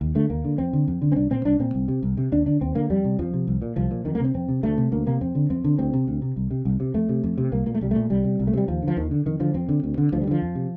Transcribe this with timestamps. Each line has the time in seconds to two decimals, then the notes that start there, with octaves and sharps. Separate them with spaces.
0.01 D#2
0.15 D3 A3
0.30 D#2 A#3
0.44 D3
0.58 F2 C4
0.73 D3
0.88 F2
1.02 D3
1.12 C4
1.16 C2 D4
1.31 A#2 C4
1.45 C2 D4
1.59 A#2 C4
1.74 C2
1.88 C3
2.03 C2
2.17 C3
2.32 D#2 D4
2.46 D3 D4
2.61 D#2 C4
2.75 D3 A#3
2.90 F2 G3
3.04 C3
3.19 F2 F3
3.34 C3
3.47 C2
3.62 A#2
3.76 C2 F3
3.91 A#2
4.05 F2 D#3
4.15 A#3
4.20 C3 C4
4.34 F2 C4
4.49 C3
4.63 D2 A3
4.78 C3
4.92 D2 A#3
5.06 C3 A#3
5.21 F2 C4
5.35 D3
5.50 F2 C4
5.64 D3
5.79 D2 C4
5.93 C3
6.07 D2
6.22 C3
6.36 C2
6.51 C3
6.65 C2
6.80 C3
6.94 F2 A3
7.09 C3
7.23 F2
7.38 C3
7.52 C2 A#3
7.66 A#2 A#3
7.75 A3
7.81 C2 G3
7.91 A#2 A3
8.10 C2 G3
8.24 C3
8.39 C2
8.47 A3
8.53 C3 G3
8.68 D#2 F3
8.83 D3
8.88 F3
8.97 D#2 D#3
9.11 D3
9.26 F2 D#3
9.40 D3 F3
9.54 F2 C4
9.69 D3
9.83 D2
9.98 D3
10.12 D2 F3
10.21 G3
10.27 D3 F3
10.42 F2
10.55 C3